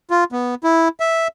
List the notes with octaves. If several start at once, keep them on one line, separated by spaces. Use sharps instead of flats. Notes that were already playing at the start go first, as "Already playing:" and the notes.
F4
B3
E4
E5